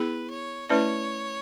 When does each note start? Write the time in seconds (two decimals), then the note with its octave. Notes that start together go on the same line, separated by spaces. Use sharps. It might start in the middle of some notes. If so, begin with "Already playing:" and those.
Already playing: B3 E4 G#4 B4
0.30 C#5
0.69 A3 C#4 E4 B4 C#5 D5